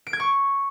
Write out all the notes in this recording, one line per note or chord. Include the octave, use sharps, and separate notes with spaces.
D7
G#6
C#6